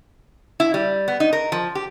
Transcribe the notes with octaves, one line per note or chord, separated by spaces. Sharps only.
E4
G3
B3
D#4
A#4
F3
G4